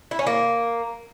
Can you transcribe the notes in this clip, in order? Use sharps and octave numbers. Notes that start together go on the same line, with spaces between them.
E4
C#4
A#3